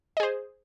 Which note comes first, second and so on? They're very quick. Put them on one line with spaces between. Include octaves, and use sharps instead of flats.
D#5 G#4 C5